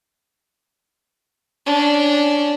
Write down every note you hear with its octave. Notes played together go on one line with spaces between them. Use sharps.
C#4 D4